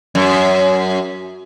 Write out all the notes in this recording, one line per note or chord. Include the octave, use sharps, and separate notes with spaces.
F#2